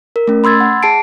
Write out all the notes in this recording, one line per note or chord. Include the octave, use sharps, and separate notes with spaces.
A#4
A3 C#4
B5 C6 E6 G#6 A6
F#5
G#4 A5 C7 D7